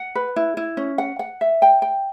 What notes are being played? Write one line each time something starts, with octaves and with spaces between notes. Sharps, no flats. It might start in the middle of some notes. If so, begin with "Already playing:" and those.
Already playing: F#5
B4
E4
E4
C#4
F#5
F#5
E5
G5
G5